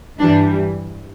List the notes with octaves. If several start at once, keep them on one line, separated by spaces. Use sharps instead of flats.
G2 E3 G3 D4